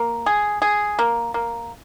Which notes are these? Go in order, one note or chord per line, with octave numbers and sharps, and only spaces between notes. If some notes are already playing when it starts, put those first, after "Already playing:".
Already playing: A#3
G#4
G#4
A#3
A#3